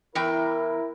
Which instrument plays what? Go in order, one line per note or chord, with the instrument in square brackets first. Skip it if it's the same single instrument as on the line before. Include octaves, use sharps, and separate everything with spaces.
[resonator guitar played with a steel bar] E2 E3 G5 [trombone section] E4 A#4